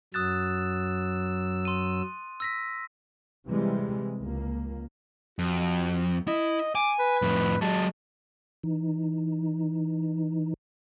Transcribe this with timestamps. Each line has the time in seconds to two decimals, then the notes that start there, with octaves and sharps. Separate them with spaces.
0.14 F#2 F#3 D#6 E6 F#6 A6
1.65 C6 D#7
2.40 E6 A#6 B6
3.47 C3 E3 G3 G#3
4.21 C#2 A#3
5.39 F2 F#4
6.28 E4 D#5
6.75 G#5 D6
6.99 B4
7.22 F2 A2
7.61 F#3 G#3 A5
8.64 E3 D#4